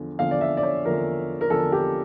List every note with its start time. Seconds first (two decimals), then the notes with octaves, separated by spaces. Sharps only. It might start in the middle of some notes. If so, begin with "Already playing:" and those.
Already playing: E2 D3 F3
0.19 E2 D3 F3 F5
0.31 D5
0.41 E5
0.57 D5
0.63 C#5
0.85 E2 D3 F3 A#4
1.41 A#4
1.50 E2 D3 F3 A4
1.72 G4